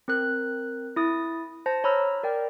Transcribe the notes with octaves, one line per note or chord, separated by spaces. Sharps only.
C4 A#4 F#6
E4 D#6 A6
C5 A5 A#6
C#5 A#5 B5 E6 F6 A#6
A#4 D5 G5